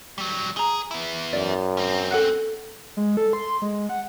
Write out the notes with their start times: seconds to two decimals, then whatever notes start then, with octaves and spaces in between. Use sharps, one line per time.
0.18 F#3 G3
0.57 G#4 A#5 G7
0.91 B3 E4
1.33 F#2 D5
1.77 C4 C#4
2.11 A4 F#5 F#6
2.97 G#3
3.17 A4
3.33 C6
3.62 G#3
3.89 F#5